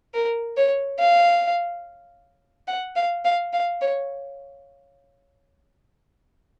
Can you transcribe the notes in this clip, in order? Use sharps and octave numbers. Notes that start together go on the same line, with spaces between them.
A#4
C#5
F5
F#5
F5
F5
F5
C#5